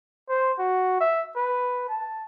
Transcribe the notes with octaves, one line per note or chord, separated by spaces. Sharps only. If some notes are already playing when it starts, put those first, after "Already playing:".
C5
F#4
E5
B4
A5